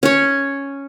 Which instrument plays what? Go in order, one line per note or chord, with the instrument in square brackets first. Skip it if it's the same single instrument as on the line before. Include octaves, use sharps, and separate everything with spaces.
[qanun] C#4 C#5